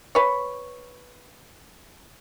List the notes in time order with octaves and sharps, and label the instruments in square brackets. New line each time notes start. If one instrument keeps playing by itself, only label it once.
[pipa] B4 C#5